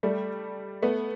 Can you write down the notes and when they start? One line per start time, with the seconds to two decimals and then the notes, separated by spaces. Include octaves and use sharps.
0.03 G3 A3
0.82 A3 B3